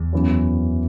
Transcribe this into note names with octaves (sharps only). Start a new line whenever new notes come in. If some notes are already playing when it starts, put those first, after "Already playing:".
Already playing: E2
F#2 E3 B3